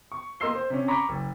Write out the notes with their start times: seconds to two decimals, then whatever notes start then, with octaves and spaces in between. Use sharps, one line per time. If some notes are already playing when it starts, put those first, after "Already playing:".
0.12 C#6
0.40 A#3 D#5 C6 E6 C7 G7
0.55 C5
0.70 C3 C#4
0.88 A#5 B5 C#6 D6 B6
1.09 F#1